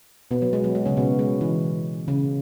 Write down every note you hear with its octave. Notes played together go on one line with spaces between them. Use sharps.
B2 B3
F#3
G#3
F#3
G#3
C#3 C#4
B2 B3
G#3
E3
C#3